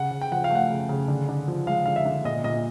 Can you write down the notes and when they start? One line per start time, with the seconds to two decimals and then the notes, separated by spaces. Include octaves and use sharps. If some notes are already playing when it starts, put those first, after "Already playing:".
Already playing: C#3 F#5
0.11 C#3
0.21 G5
0.32 F3 F#5
0.44 F5
0.50 A3 F#5
0.70 C#3
0.89 C#3
1.08 D3
1.29 D3
1.48 F3
1.67 G#3 F5
1.86 D3 F5
1.96 E5
2.06 D3
2.24 A#2 D#5
2.44 A#2 D#5